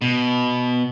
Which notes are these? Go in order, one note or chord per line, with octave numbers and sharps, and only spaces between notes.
B2